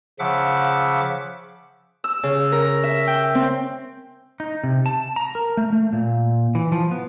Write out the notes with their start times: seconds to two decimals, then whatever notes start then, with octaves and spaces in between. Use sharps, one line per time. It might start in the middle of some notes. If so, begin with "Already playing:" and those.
0.19 C#3 F3 E5 F#5 D6
2.04 E6
2.23 C#3
2.52 A#4
2.84 E5
3.07 G5
3.35 C4
4.40 D#4
4.64 C3
4.86 A5
5.16 A#5
5.35 A#4
5.57 A3
5.73 A3
5.93 A#2
6.55 E3
6.72 F3
6.91 B3